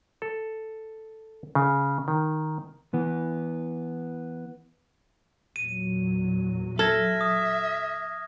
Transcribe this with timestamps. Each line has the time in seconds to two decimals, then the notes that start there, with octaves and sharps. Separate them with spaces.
0.22 A4
1.55 C#3
2.08 D#3
2.94 E3 B3
5.56 E2 A#2 F#3 D#7
6.79 A4 E5 F6 G#6 A#6
7.21 D#6